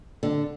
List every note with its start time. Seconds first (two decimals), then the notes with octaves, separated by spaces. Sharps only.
0.23 D3